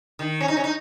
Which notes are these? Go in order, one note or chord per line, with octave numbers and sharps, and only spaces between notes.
D#3
C#4
D#4
C#4
D#4